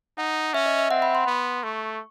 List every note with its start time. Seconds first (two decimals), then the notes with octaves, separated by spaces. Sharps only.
0.18 D#4 F#5
0.54 C#4 E5
0.66 D#5
0.79 E5
0.91 C4 F#5
1.02 B5
1.15 C6
1.26 B3
1.63 A3 C#6